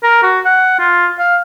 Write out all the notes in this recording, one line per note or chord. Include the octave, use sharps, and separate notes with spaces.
A#4
F#4
F#5
F4
F5